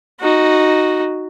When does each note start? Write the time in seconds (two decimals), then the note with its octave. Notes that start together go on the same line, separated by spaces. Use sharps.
0.20 D#4 F#4